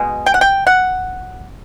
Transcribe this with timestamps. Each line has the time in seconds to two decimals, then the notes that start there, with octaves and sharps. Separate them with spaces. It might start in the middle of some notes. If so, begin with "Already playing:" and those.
Already playing: B2 G#3
0.26 G5
0.34 F#5
0.41 G5
0.67 F#5